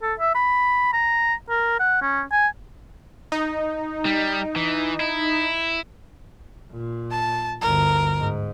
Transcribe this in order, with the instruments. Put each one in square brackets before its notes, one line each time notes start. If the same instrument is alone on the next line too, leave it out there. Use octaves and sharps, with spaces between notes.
[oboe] A4
E5
B5
A#5
A#4
F#5
C#4
G#5
[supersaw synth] D#4
[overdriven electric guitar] G3
E3
E4
[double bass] A#2
[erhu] A5
[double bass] G1 D2 [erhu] A#4
[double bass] G#2